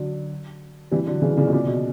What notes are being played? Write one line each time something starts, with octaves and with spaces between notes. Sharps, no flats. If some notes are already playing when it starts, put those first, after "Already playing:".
Already playing: D3 F#3
E3 G3
D3 F#3
C#3 E3
A#2 C#3
B2
A#2 C#3
B2